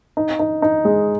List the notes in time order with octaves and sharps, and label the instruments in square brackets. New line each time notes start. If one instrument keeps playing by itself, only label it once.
[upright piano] D#4
D#4
D#4
G#3